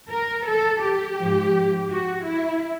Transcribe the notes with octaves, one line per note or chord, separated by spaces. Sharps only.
A#4
A4
G4
G#2 F3
F#4
E4